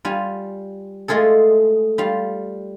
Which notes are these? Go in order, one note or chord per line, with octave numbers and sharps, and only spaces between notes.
G3 F4 G#5
G#3 A3 F4 G#4 A4
G3 F4 F5